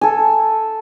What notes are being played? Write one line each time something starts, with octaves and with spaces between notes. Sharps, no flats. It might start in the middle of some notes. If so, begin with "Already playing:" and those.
A4 G#5